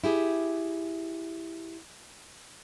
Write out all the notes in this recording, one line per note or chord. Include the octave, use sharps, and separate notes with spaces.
E4 G4 G#4